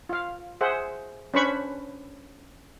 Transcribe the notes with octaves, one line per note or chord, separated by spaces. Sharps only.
F4 F5
G#4 C5 E5 F#5
C#4 D4 B4 C5 B5 C#6